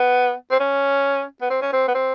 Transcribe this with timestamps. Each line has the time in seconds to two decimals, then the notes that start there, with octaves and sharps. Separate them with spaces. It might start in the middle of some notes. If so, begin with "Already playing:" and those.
Already playing: B3
0.51 C4
0.60 C#4
1.41 B3
1.50 C4
1.62 C#4
1.73 C4
1.88 B3
1.95 C4